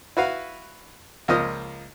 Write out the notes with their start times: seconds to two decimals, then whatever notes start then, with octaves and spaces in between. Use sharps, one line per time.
0.17 E4 F#4 B4 F5
1.28 C#2 F3 A#3 D#5 D#6 F6